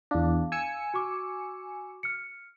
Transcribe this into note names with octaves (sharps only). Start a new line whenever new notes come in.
E2 D4 F5
G#5 E6 C#7
F#4 C#6 D6
F6 C#7